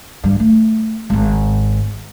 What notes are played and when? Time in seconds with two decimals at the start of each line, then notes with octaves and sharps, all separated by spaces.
0.24 G2 E3
0.40 A3
1.10 G#1 G#2